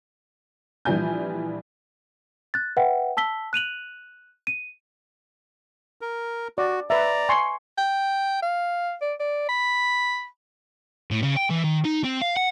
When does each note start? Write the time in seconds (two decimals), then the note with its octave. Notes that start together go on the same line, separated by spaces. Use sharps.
0.85 A#1 E3 F3 G3 G#5 G6
2.54 F#6 A6
2.77 B4 E5 F#5 G5
3.17 A5 E6 B6 G7
3.53 F#6 D#7 F7 F#7
4.47 D#7
6.01 A#4
6.58 F#4 D5
6.90 B4 D5 E5 A#5
7.29 G#5 C6 C#6
7.78 G5
8.42 F5
9.02 D5
9.20 D5
9.49 B5
11.11 A2
11.23 C#3
11.37 G5
11.50 E3
11.64 D#3
11.85 D#4
12.04 C4
12.22 F5
12.37 F#5